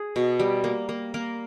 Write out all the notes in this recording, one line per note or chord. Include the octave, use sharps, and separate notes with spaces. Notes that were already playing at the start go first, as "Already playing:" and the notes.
Already playing: G#4
B2
G3
A#3
A#3
A#3 A#4